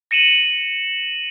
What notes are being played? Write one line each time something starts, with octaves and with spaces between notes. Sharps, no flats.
A#6 C#7 D#7 E7 F#7